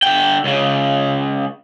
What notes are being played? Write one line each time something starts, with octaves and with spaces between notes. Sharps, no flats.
D3 G5
C#2 C#3